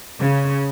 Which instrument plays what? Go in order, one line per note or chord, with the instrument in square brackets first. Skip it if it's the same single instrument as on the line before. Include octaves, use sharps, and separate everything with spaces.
[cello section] C#3